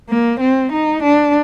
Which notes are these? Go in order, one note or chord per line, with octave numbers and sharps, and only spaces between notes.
A#3
C4
D#4
D4